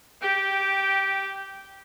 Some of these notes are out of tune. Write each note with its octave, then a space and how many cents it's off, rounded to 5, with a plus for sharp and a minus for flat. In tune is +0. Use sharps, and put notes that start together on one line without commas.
G4 -10 G5 +0